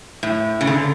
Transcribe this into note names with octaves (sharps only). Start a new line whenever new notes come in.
A2
C#3
D3